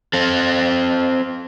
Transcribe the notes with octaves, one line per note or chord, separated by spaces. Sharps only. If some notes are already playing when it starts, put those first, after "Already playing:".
C4 A4